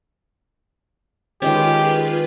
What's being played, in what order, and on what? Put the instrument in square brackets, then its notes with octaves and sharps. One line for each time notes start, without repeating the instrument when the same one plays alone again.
[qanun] D#3 G#3 C#4 [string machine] F4 G#4 B4 [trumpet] G4